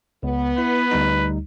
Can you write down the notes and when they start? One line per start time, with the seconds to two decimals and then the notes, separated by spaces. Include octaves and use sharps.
0.23 C#2 B3
0.58 E4 B4
0.91 D2 G3 D#4